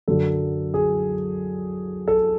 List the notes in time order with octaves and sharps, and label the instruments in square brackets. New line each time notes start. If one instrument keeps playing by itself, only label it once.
[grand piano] F#2 D3 F#3 A4
G#4
A4